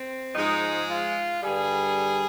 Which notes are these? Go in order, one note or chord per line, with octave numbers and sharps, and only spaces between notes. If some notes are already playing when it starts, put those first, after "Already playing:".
Already playing: C4
G#2 F3 G#3 D#4
F4
G2 D3 G3 G#4